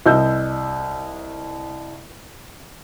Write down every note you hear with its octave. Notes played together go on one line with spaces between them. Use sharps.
C2 D#5 E6 G6